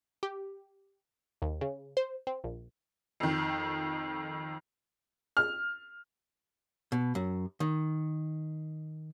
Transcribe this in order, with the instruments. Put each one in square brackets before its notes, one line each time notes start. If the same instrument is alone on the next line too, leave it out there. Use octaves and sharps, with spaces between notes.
[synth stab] G4
D#2
C#3
C5
C4
A#1
[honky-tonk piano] F2 D#3
[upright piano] F6
[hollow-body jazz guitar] B2
F#2
D#3